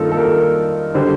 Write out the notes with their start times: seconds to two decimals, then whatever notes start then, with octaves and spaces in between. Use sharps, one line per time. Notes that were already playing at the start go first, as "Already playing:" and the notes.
Already playing: G2 D#3 A#3 D#4 F4 A4
0.12 A4
0.17 A#4
0.95 D3 G3 C5